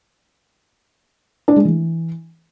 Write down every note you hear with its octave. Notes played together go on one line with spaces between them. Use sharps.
D4
G#3
E3